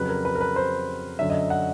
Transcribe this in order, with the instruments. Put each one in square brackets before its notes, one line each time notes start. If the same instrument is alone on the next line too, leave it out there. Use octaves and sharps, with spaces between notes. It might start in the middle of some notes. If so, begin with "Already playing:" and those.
Already playing: [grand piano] F2 C#3 F#3 B4
A#4
B4
A#4
B4
C5
F#2 D3 F#3 E5
D#5
F#5